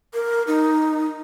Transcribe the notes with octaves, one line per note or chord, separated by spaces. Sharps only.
A#4
D#4